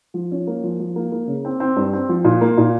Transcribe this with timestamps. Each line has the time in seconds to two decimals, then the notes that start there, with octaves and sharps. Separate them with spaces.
0.14 F3
0.31 C#4
0.47 A#3
0.64 F3
0.80 F3
0.96 A#3
1.12 A#3
1.28 C#3
1.45 C4
1.60 C4
1.76 G2
1.93 C4
2.09 F3
2.24 A#2
2.41 A#3
2.58 A#2